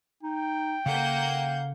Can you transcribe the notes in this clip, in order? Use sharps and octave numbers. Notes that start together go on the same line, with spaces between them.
D#4 G5
C#3 A#3 A4 F5 F#5 G6